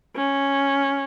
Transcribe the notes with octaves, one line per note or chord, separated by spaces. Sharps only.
C#4